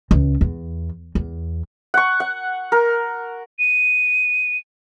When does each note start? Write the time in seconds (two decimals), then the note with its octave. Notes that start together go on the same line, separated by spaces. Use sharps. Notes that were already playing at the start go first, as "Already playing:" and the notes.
0.11 C#2
0.41 E2
1.15 E2
1.94 F#5 C#6
2.20 F#5
2.72 A#4
3.59 D#7